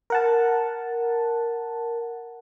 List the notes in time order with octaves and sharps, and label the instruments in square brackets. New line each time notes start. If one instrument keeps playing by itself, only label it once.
[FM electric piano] A#4 F#5 A5